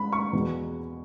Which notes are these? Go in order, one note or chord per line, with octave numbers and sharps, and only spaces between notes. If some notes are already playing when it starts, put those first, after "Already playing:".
Already playing: B5
C#6
E2 B2 G#3